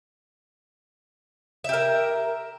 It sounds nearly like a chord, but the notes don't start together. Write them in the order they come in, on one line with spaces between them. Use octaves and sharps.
E5 G4 A#4